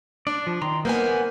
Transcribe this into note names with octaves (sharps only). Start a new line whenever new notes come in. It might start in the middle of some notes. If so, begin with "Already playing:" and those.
D4 D5
F3
D#3 A#5 C6
A#3 B3 A#4 C5 D#5 G#5